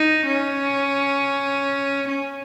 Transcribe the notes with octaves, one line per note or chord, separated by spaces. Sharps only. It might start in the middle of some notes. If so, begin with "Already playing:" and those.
Already playing: D#4
C#4
C#4